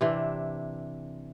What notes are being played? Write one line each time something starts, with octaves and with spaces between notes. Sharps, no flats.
C3 E3 D4